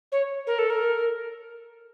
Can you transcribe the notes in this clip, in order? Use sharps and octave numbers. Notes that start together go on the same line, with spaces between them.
C#5
A#4
A4
A#4